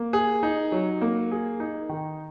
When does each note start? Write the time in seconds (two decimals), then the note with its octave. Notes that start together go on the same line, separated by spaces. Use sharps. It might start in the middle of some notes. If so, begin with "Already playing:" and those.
Already playing: A#3
0.13 G#4
0.43 D#4
0.72 F#3
1.01 A#3
1.31 G#4
1.60 D#4
1.89 D#3